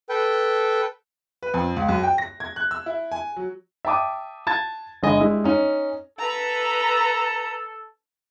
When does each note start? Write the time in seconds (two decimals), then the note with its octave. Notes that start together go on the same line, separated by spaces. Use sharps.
0.09 A4 B4 G5
1.43 B4
1.54 F2
1.76 C#2
1.89 F#2
2.03 G5
2.18 A#6
2.40 G#6
2.56 F#6
2.71 E6
2.86 E4
3.12 G#5
3.36 F#3
3.85 E5 G5 A5 D6 D#6
4.47 A5 G#6 A6
5.03 G1 G#3 D#5 G#5
5.20 G3 G#3 E4
5.44 C#4 D#4
6.19 A4 B4 A#5